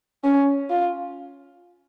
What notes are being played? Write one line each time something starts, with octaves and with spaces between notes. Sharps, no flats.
C#4
F4